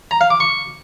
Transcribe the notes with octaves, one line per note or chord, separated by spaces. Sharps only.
A#5
F5
D6
C#6